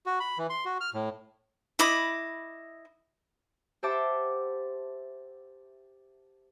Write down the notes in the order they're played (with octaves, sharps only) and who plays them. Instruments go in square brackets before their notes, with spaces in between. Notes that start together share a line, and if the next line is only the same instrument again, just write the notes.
[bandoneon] F#4
B5
E3
C6
F#4
F6
A2
[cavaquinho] E4 D#5 B5 D6
[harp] G4 C5 E5 F#5 A5 D6